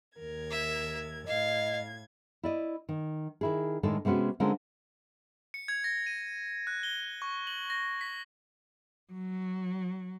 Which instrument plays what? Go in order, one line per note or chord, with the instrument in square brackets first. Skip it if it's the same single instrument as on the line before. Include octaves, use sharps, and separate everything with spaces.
[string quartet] D#2 A#4 G#6
[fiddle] E5
[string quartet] A2 G#6 [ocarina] D#5 [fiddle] F5
[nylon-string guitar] E4 D5 D#5
D#3
D#3 E4 G#4
A2 D#3 G#3 D4 G#4 A4
C3 G#3 B3 C#4 F#4
D3 G#3 C4 C#4 F4 A#4
[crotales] C#7
G#6
A#6
D#7
F#6
G7
C#6
F#7
A#6
B6
[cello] F#3